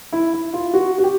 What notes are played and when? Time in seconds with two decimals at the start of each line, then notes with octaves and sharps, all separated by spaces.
0.13 E4
0.33 E4
0.53 F4
0.74 F#4
0.98 F#4
1.03 G4